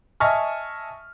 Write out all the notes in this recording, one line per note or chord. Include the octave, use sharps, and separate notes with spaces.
D#5 E5 G#5 A5 C#6 F6